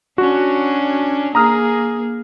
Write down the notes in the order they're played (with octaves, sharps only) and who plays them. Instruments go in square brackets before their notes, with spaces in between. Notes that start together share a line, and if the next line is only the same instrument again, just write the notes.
[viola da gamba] C#4 D4 [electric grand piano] F#4
[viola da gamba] A#3 G#4 [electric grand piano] A#5 D#6 F6